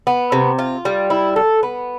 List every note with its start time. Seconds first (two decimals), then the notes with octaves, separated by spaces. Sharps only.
0.07 B3
0.32 C3
0.59 F4
0.85 G3
1.10 E4
1.36 A4
1.63 B3